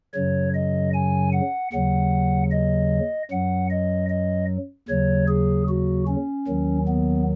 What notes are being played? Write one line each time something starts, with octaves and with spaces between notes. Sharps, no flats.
F#2 C#3 F#3 C#5
D#5
G#5
F#5
D#2 C#3 F#3 F#5
D#5
F#2 F#3 F#5
D#5
D#5
D#2 C#3 F#3 C#5
G#4
F#4
C#4
D#2 D#3 F#3
B3